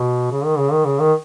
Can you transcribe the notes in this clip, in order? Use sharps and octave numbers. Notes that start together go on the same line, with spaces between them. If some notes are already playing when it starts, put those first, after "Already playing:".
Already playing: B2
C#3
D#3
C#3
D#3
C#3
D#3